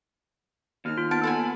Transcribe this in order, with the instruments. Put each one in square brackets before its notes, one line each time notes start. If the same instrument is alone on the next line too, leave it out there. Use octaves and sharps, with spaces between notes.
[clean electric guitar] D#2 [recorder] F6
[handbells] F4
[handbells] B3 D7 [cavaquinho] A5
[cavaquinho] A4 F#5 G#5 [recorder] B5